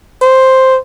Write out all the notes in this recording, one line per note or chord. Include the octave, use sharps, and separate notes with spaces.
C5